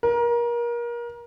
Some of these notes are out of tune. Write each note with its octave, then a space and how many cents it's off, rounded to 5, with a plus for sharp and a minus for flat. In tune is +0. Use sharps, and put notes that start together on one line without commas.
A#4 +30